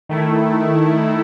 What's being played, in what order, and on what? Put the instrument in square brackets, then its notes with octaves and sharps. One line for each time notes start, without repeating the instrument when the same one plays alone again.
[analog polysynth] D#3 A3 E4